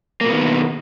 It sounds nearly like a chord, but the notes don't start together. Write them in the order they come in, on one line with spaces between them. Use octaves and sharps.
A#3 B2 B3 D#3